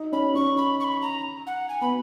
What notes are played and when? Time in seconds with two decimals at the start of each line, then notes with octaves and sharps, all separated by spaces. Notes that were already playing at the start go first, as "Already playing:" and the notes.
Already playing: D#4
0.12 C#4 B5
0.35 C#4 C#6
0.57 B5
0.80 C#6
0.84 B5
1.02 A#5
1.47 F#5
1.69 G#5
1.81 B3 B5